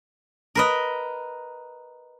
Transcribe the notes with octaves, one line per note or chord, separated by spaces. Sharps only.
A#4 B4 D#5